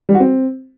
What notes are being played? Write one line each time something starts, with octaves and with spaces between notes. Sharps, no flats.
G3
F#4
C4